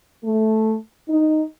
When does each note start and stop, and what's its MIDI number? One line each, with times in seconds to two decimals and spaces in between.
0.23 0.74 57
1.08 1.42 63